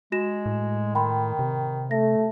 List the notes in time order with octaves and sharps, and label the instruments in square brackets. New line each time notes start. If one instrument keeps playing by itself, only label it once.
[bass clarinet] G#3 [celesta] F#4 A#6 E7
[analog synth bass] A2
[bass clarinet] D#3 [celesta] G5 B5 C6
[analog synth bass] C3
[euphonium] A3 [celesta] A#6